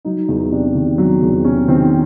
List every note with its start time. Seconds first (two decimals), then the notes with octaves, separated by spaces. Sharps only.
0.05 F#3 D#4
0.28 E2
0.52 C3 D4
0.75 D#3
0.98 F#3
1.22 E2
1.45 C3 C#4
1.68 D#3 C4